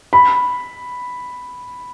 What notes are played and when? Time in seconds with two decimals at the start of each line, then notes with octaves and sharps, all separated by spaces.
0.13 B5